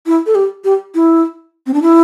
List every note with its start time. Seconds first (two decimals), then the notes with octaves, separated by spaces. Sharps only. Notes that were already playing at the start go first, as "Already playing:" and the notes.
0.07 E4
0.26 A4
0.35 G4
0.64 G4
0.95 E4
1.67 C4
1.74 D4
1.82 E4